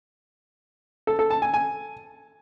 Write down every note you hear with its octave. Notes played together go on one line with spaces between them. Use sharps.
A4
A4
A5
G#5
G#5